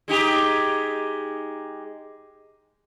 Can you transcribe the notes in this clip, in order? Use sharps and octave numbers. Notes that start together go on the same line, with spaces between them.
G#3 D#4 G4